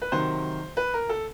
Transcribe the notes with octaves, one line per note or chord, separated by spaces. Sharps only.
B4
C3 D#3 F#3 C5
B4
A#4
A4